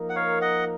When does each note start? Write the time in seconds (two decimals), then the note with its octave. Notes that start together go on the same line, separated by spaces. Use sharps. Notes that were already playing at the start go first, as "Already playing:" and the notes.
Already playing: F3 A#3 D#4 A#4
0.10 F#5
0.16 C#5 F5
0.41 D#5 F#5